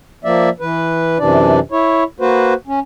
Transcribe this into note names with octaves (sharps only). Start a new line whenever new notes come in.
F3 A#3 D5 E5
E3 B4
F#2 C3 E3 D4 D5
E4 C#5
A#3 F#4 B4 C5
C#4